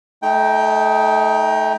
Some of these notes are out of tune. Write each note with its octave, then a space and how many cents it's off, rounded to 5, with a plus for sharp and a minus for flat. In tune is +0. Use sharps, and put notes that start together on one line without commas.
A3 -20 D#4 +20 G5 +0